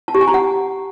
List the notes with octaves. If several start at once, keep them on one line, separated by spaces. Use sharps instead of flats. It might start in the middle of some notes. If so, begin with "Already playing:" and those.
A5
G4
G#5
A#5
F#5